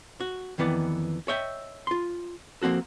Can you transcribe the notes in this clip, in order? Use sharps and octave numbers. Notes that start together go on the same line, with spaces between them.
F#4
F2 D#3 E3 B3 D5
C#5 D#5 E5 G5
F4 C6
F3 A#3 C4 F#4 A4